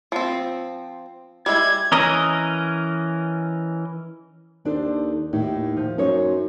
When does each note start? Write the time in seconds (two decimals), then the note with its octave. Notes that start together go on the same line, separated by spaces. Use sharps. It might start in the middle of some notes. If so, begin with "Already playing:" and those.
0.12 F3 C4
1.46 G3 G#3 E4 G#6
1.91 E3 C#4 A#4 D#5
4.65 D#2 D4 A4 C5
5.33 D#2 A2
5.77 F3
5.98 F#2 D#4 C5 C#5